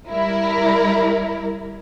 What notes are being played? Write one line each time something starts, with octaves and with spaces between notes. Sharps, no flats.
G3 E4 A#4